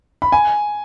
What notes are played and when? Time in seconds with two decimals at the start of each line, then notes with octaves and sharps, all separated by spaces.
0.22 B5
0.32 G#5